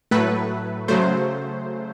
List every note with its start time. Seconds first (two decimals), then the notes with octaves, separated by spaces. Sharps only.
0.11 A2 F#3 A3 B4
0.88 C#3 F#3 A3 C5